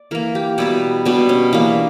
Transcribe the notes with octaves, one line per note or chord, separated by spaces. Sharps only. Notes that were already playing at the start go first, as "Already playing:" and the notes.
Already playing: D5
E3 A#3 A#4
G4
B2 G3 B3 E4
B2 G3 B3 D4
C#4
E3 A#3 D4